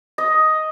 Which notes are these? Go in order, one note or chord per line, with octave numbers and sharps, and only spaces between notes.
D#5